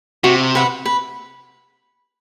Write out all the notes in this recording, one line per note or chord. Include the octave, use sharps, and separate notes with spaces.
C3 F#4
B4 F#5
B4